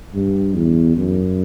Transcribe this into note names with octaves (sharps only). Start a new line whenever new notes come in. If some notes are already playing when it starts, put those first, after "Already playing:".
G2
E2
F#2